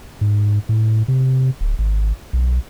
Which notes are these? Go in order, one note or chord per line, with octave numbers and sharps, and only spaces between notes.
G#2
A2
C3
D1
G#1
B1